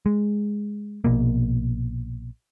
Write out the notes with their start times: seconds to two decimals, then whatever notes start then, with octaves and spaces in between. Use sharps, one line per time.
0.06 G#3
1.04 A#1 B2 A#3